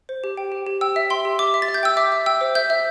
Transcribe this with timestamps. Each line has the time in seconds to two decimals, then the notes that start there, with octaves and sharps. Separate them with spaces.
0.09 C5
0.24 G4
0.37 G5
0.52 G4
0.66 G4
0.81 G5 E6
0.96 E5
1.10 G5 C6
1.25 G4
1.39 E5 D6
1.54 E5
1.62 A6
1.68 E5
1.74 G6
1.83 G5 E6
1.97 E5 D6
2.12 E5
2.26 G5 E6
2.41 C5
2.55 E5 G6
2.70 E5